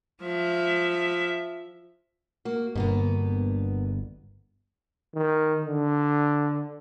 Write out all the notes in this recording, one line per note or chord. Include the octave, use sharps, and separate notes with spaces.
F3 E5
A#3 F#4
G1 B2 A#3 B3
D#3
D3